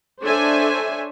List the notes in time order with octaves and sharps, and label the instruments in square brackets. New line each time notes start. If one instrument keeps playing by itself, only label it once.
[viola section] D4 A4 C5 C#5 E5 G#5